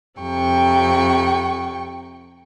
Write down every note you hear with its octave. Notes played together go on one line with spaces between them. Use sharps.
F2 C3 G5 C#6